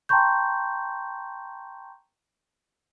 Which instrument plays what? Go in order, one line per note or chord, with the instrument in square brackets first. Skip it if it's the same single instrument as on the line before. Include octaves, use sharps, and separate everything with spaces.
[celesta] G5 A5 A#5 C6 C#6 G6